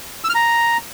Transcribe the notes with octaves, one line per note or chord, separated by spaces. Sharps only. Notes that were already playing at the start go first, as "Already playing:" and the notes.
E6
F6
A#5